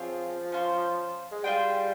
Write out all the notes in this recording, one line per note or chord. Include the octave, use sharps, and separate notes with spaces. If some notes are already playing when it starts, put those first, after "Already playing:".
Already playing: F3 C4 F4 G#4 C#5
C#4 F4 C5
G#3
G3 F4 G#4 C5 G5